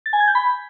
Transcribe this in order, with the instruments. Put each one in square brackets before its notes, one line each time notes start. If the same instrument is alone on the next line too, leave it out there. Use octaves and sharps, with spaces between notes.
[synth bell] A6
G#5
G#6
G6
B5